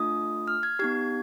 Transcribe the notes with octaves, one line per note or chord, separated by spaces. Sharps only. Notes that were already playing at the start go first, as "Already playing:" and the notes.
Already playing: A3 D4 F4 D#6
F6
G#6
B3 D#4 G4 G#6